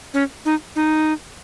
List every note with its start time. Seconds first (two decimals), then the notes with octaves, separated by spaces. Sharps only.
0.14 C#4
0.45 D#4
0.76 D#4